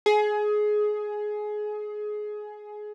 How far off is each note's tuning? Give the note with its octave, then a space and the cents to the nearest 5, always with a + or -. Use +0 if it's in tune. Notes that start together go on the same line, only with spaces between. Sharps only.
G#4 +20